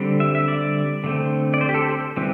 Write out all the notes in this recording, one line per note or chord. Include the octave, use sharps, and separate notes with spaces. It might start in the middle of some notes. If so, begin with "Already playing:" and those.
Already playing: D3 G3 C4
E5
E5
D5
D3 A3 C4
D5
C5
G4
A4
C5
E3 G3 C4